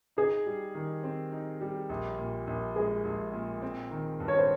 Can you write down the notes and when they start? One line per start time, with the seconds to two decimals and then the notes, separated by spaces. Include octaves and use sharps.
0.17 D#4 G#4
0.46 G3
0.75 D#3
1.04 C4
1.32 D#4
1.61 G3
1.89 A#1
2.18 A#2
2.47 A#1
2.76 G#3 G#4
3.05 A#1
3.33 A#2
3.62 C4
3.91 D#3
4.20 G2
4.28 C#5
4.39 C5